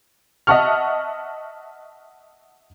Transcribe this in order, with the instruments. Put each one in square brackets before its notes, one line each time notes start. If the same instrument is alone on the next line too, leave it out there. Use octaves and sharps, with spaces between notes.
[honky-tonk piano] D#5 E5 F#5 A5 C#6 F6